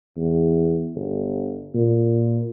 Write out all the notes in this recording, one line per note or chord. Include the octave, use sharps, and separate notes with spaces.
E2
G1
A#2